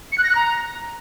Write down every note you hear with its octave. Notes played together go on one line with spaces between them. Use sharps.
C#7
F#6
A#6
F#6
A#5